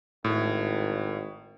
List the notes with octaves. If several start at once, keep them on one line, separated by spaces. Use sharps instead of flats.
G#1 A2